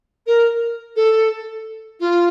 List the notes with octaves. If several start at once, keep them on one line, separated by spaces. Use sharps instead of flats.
A#4
A4
F4